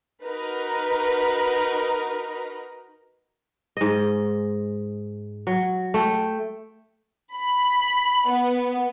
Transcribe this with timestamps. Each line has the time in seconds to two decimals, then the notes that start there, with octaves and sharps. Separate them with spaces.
0.24 D#4 F#4 A#4 B4 A#5
3.77 G#2 D#5
5.47 F#3
5.94 A3 G5
7.35 B5
8.28 B3